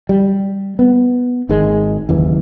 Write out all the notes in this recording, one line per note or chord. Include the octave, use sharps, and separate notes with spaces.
G3
B3
G#1 G#2 D#3 G#3
F#1 D#2 E3